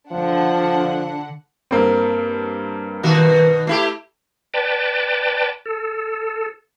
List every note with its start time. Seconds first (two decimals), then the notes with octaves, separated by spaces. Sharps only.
0.11 D3 F3 D4 F#5
1.71 G2 A#3 C4
3.03 B2 D#3 F#4
3.67 A3 E4 G4
4.54 B4 D5 G5 A5
5.66 A4